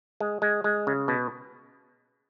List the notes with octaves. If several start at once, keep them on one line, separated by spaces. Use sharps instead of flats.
G#3
G#3
G#3
C#3
B2